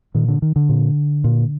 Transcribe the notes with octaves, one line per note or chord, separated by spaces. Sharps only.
A#2 D#3
D3
D#3
D3
A#2
A#2